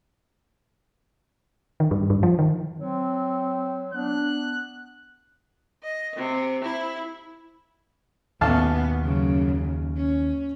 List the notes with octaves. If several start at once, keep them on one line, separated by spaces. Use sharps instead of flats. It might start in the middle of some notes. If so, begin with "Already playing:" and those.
D#3
G2
G2
F3
D#3
F#3 C4
B3 D4 F#6
D#5
C3
E4
A1 D#2 B2 B3 F5 A5
F#2 C#3
C#4